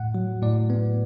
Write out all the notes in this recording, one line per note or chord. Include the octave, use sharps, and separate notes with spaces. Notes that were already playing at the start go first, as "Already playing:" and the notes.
Already playing: A2 F#5
F#3
A2 D5
B3